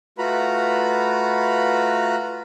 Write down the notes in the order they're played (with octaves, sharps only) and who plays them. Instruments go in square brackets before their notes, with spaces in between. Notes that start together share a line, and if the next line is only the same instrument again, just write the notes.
[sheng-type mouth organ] A3 F4 F#4 B4 A#5 B5